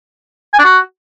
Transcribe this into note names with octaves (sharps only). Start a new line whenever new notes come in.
G#5
D4
F#4